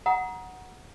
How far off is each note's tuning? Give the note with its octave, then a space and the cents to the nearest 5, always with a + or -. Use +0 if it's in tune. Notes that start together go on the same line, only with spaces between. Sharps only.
F#5 +0 A#5 +20 D#6 +20